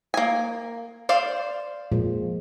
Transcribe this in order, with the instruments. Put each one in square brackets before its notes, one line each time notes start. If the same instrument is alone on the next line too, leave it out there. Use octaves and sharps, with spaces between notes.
[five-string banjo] A#3 G#5
C5 D5 F5
[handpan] A#2 F3 G#3